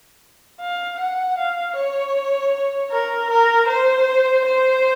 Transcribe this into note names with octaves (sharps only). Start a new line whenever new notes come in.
F5
F#5
F5
C#5
A#4
A#4
C5
C5